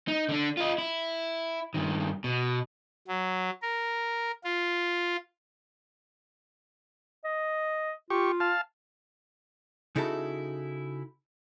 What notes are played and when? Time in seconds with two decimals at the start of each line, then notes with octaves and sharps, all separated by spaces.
0.08 D#4
0.29 D3 D4
0.57 F4 D#5
0.78 E4
1.74 G2 D#3
2.24 B2
3.08 F#3
3.62 A#4
4.44 F4
7.25 D#5
8.10 F4 G4 C#6
8.40 F5 A5
9.96 C#3 D#4 E4 F#4 A4